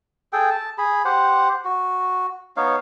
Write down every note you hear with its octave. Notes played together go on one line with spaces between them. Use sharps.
G#4 A4 G5
A5
G#4 B5
G4 C5 F#5
F#4
B3 D#4 C#5 F5